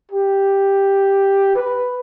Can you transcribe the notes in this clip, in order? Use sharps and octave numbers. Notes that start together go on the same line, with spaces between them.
G4
B4